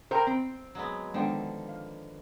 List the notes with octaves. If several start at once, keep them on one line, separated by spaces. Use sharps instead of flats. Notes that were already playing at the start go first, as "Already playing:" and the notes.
A#4 C5 G5 A#5
C4
F#3 G#3 B3
D3 D#3 F3 G#3 B3 G5
F5